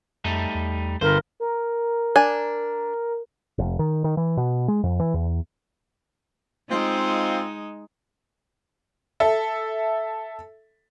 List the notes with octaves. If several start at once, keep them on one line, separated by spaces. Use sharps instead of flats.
F2 G3 A3 D#4
E2
G1 G3 A#4 C5
A#4
D4 G#5
F1
D#3
D#3
E3
B2
G#3
F2
E3
E2
G#3 C4 D#4 F4
A4 E5